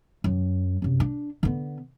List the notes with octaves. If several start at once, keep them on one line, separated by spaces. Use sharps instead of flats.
F#2
F#2 C3
D4
D3 B3